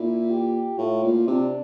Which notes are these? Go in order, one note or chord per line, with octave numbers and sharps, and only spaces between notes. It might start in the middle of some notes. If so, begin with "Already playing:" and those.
Already playing: A#2 E4
G4
A2 F4
A#2
C3 D4